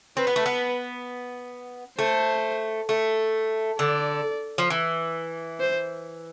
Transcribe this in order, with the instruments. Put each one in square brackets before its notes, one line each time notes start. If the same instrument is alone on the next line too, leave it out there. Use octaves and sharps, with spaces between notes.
[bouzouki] C4 [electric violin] B4
[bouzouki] B3
A3
B3
[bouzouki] A3 [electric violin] C5
[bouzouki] A3
[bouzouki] D3 [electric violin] D5
[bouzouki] F3
E3
[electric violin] C5